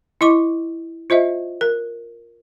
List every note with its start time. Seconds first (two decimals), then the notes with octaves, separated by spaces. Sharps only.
0.21 E4 D#5 C#6 D6
1.10 F4 C5 D#5 E5
1.61 A#4